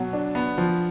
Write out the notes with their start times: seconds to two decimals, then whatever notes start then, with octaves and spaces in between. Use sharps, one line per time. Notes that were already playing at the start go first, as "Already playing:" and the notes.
Already playing: B2 F#3
0.13 D4
0.35 B3
0.58 F3